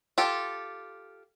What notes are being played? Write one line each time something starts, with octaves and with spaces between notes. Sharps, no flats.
F4 G4 A4